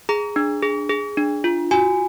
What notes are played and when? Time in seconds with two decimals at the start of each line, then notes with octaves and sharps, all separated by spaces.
0.09 G#4 A#5
0.36 D4
0.62 G#4
0.90 G#4
1.17 D4
1.44 F4
1.71 F#4 G#5